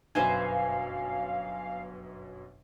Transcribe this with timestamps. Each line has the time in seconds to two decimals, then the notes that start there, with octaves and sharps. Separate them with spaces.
0.15 G1 F#2 B2 B4 C5 E5 F5 G#5